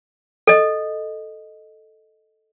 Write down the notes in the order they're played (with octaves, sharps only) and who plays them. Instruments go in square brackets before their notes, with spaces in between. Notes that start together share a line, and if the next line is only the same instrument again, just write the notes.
[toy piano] A4 D#5